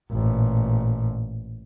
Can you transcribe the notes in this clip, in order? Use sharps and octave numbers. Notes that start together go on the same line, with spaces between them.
A1 A#2